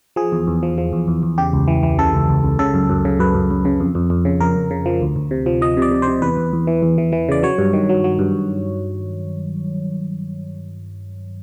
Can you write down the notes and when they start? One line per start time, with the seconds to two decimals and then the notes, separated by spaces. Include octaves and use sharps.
0.16 F3 G#4
0.32 E2
0.47 E2
0.63 F3
0.78 F3
0.93 E2
1.08 E2
1.23 E2
1.38 C#3 G4
1.53 C#2
1.68 E3
1.83 E3
1.98 C#3 A4
2.14 C#2
2.29 C#2
2.44 C#2
2.59 C#3 A4
2.74 F#2
2.90 F#2
3.05 C#3
3.19 F#2 B4
3.34 F#2
3.50 F#2
3.65 C#3
3.80 F2
3.95 F2
4.10 F2
4.25 C#3
4.40 F2 A#4
4.56 F2
4.71 C#3
4.86 F3
5.01 D2
5.16 D2
5.31 C3
5.46 F3
5.61 F3 D#5
5.77 C3 D5
5.91 C3
6.02 C5
6.08 C3
6.22 E2 B4
6.37 E2
6.53 E2
6.67 E3
6.82 E2
6.98 E3
7.12 E3
7.29 C#3 D5
7.43 F#3 C#5
7.58 G2
7.73 D#3
7.89 F#3
8.04 F#3
8.19 G2